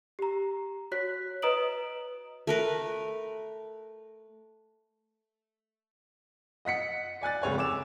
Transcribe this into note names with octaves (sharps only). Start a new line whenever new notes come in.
G4 A#5
F#4 C#5 F#6 B6
B4 D#5 A#5 D#6 D7 F#7
A3 A#4 B4
D#5 F#5 B6 C#7
D5 G#5 F#6 A6
F1 C#2 C#5 G#5
D6 E6 E7